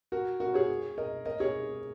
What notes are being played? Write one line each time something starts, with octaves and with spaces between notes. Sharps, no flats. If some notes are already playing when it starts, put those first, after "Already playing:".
F#4 A#4
F#4 A#4
G#4 C#5
A#4 D#5
A#4 D#5
G#4 C#5